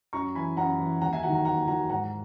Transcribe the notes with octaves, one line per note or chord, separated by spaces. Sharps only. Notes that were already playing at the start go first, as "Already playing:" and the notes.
F#2 A#5 C#6
E3 G#5 B5
F#2 F#5 A#5
E3
D#2 F#5 A#5
E5 G#5
D#3 F#3 F#5 A#5
F#5 A#5
D#2 F#5 A#5
D#3 F#3 F#5 A#5
G#2 F#5 A#5